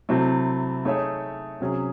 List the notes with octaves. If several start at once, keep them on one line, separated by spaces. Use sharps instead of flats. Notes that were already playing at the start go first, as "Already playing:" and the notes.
C3 F#3 A3 C4 E4
A3 D#4 G#4 C#5 E5
C3 F#3 C#4 G#4